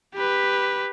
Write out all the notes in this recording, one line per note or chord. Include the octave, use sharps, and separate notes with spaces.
G4 B4